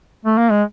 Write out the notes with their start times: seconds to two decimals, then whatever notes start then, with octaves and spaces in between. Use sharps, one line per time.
0.25 A3
0.38 A#3
0.51 G#3